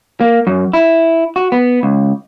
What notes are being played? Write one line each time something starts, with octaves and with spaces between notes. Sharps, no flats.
A#3
F#2
E4
F#4
B3
C#2